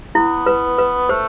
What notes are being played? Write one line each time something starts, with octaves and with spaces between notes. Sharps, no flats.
B3 E4
B4
B4
A3 C5